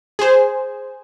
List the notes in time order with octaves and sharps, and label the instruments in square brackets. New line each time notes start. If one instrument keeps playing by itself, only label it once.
[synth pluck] G#4 C5